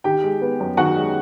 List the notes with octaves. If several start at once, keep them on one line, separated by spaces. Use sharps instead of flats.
D#3 G4 G5
G#3
B3
F#2
D#3 F#4 F#5
G#3